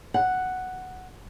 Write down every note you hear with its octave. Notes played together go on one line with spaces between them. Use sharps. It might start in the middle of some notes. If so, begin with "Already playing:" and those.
F#5